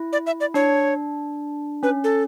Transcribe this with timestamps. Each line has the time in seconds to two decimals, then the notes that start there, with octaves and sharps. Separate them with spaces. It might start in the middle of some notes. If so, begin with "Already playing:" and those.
Already playing: E4
0.13 D5
0.27 E5
0.40 D5
0.54 D4 C#5
1.83 C#4 B4
2.04 A4